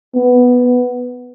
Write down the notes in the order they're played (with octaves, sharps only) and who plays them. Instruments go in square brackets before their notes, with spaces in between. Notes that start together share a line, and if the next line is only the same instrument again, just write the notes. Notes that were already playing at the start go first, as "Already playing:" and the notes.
[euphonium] B3